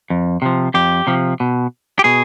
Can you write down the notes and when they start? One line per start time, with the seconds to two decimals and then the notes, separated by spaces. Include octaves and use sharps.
0.10 F2
0.42 C3 F3
0.74 F2 G4
1.07 C3 F3
1.40 B2
1.99 G4
2.04 B2 G#4